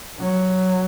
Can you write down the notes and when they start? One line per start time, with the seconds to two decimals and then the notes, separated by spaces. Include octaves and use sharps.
0.20 F#3